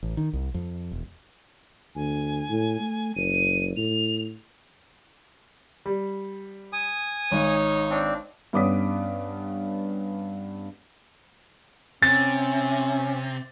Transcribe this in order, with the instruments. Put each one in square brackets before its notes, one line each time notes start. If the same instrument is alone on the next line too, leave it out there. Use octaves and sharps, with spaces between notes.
[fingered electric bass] A1
D#3
C2
F2
E1
[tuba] D2 [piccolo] G#5
[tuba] A2
A3
[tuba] F#1 [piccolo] D#7
[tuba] A2 [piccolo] F7
[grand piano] G3
[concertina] G#5 D#6
[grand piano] G#1 [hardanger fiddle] D#4 C#5
[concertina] C4 D4
[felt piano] G2 B3 C#4 D6 D#6 B6
[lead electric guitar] C3 [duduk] C#4 [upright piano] A6